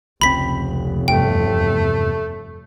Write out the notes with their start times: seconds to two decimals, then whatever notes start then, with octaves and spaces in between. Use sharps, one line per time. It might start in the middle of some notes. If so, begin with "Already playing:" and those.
0.21 F1 C#2 A3 C4 B5 B6
1.08 E2 G2 C3 A3 G5